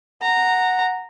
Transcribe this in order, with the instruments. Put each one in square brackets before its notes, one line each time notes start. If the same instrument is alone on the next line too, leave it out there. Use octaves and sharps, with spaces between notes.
[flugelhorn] F#5 [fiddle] A#5